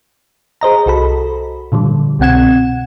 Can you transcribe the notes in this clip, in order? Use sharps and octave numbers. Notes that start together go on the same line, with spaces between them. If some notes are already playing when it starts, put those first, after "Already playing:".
G#4 C5 D#5 A#5
C2 F#4 A4 B5
A#2 D3 F3 G3
C2 B2 C4 F#5 G#6 E7